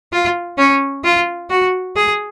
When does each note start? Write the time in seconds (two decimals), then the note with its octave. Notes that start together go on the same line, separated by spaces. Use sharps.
0.13 F4
0.58 C#4
1.04 F4
1.50 F#4
1.96 G#4